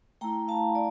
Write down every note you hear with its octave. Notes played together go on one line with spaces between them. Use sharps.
A3 E4 G5 A#5
F5 A5
D5